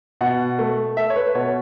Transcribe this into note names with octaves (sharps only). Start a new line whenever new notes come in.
B2 F#5
A3
A3 E5
C#5
B4
B2 C#5